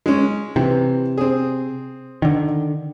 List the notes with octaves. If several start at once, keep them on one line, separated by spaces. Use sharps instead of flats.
G#3 C#4
C3 E3
C4 G#4
D3 D#3